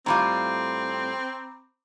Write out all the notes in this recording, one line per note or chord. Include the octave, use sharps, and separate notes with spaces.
A2 G3 C4 F4 A#5 B5 D6